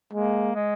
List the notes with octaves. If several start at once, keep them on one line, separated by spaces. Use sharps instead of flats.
G#3 A#3
G#3